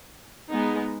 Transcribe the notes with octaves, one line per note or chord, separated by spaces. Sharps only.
G#3 B3 D#4